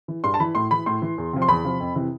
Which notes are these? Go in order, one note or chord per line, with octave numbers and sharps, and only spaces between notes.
E3
G2 C6
A5
E3 B5
A2 C6
E3 B5
A2 C6
E3
E2
C3 F3
C6
E2 B5
C3 F3
F2
C3 E3